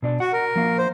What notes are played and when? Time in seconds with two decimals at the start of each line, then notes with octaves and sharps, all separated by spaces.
0.02 B2 D4 D5
0.20 F#4 F#5
0.33 A#4
0.56 F3 A#3 F5
0.78 C5